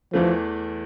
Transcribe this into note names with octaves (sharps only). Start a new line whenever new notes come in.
E2 E3 F3 A3